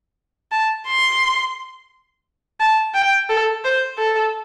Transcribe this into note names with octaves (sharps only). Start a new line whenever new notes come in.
A5
C6
A5
G5
A4
C5
A4